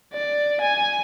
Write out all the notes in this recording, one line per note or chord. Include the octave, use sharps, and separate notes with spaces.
D5
G#5